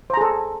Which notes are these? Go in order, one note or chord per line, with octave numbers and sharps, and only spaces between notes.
G#4 A4 C5 A#5